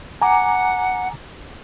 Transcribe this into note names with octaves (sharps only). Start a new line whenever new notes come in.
F#5 G#5 A#5 D6